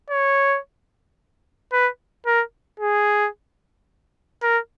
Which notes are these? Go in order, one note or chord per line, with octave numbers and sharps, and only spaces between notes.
C#5
B4
A#4
G#4
A#4